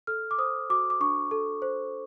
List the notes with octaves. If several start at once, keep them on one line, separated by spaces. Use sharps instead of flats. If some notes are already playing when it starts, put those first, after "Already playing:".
A4 F6
D6
C5 D#6
F#4 D6
D6
D4 C#6
A4
C5